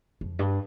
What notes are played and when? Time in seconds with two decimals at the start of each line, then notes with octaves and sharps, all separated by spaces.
0.21 F2
0.39 G2